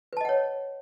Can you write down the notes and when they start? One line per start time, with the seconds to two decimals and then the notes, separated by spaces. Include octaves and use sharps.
0.13 B4
0.17 A5
0.21 D#5
0.25 F#5
0.29 C#5